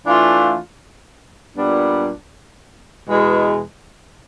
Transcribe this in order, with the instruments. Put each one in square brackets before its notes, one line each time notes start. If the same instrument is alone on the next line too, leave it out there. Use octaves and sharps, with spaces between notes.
[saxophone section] E3 A3 D4 F4
A#2 G3 B3 D4
E2 B2 G#3